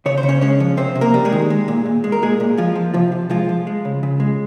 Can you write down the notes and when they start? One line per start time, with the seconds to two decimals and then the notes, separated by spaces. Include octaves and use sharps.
0.06 C#3 C#5
0.18 C5
0.23 C#3
0.28 C#4 C#5
0.41 G#3 C#4 C#5
0.60 F3
0.77 C3 C4 C5
0.95 C3
1.01 A#3 A#4
1.14 G3
1.25 G#3 G#4
1.32 D#3
1.50 G#3
1.68 A#2
1.86 A#2
2.04 G#3
2.12 A#4
2.22 A#2 G#3 G#4
2.40 A#2
2.57 F3 G#3 F4
2.75 F3
2.94 C3 F3 F4
3.12 C3
3.30 F3 G#3 F4
3.49 F3
3.67 G#3
3.85 C#3
4.03 C#3
4.20 G#3